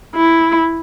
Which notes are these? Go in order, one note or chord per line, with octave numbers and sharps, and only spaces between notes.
E4